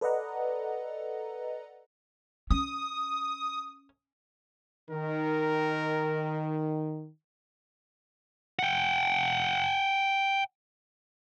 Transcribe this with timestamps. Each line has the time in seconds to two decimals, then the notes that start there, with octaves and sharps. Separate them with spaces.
0.01 A4 B4 D5 D#5 F#5 A#5
2.51 C#4 D#6
4.90 D#3 A#4
8.59 F#5 G5